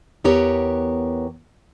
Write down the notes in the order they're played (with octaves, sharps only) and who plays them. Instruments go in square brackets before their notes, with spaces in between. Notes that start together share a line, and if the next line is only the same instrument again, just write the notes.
[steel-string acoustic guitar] E2 B3 G4 A#4 C#5